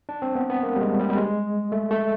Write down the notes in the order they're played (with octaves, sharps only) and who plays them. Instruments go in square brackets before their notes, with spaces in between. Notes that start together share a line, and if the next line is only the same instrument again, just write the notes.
[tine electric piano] D4
C4
B3
B3
A#3
G3
G#3
G3
G3
G#3
A3
A3